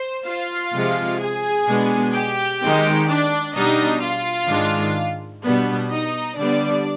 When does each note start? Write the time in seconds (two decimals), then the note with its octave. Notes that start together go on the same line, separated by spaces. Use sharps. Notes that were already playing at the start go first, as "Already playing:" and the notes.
Already playing: C5
0.26 F4 F5
0.73 C3 F3 G#3
1.20 G#4 G#5
1.67 B2 G#3 B3 D4
2.14 G4 G5
2.62 D#3 G#3 C4 D#4
3.08 D4 D5
3.55 B2 G3 D4 D#4 D#5
4.02 F4 F5
4.49 G#2 D#3 G#3 D4
5.43 B2 G3 B3 D4
5.90 D#4 D#5
6.38 D3 G3 B3 D4 D5